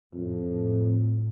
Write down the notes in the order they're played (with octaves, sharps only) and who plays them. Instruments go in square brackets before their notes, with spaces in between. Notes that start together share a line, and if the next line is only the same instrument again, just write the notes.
[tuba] F2 [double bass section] A2